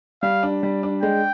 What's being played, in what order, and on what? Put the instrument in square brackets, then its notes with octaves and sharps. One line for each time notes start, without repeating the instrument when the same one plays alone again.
[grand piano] G3 [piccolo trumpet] F5
[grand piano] D4
G3
D4
[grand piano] G#3 [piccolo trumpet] G5